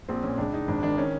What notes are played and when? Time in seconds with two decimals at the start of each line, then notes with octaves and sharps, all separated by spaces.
0.08 A#1 C4
0.23 A#2 C#4
0.38 C#2 D4
0.53 C#2 D#4
0.68 G#1 D4
0.83 D#3 D4
0.98 D#3 C#4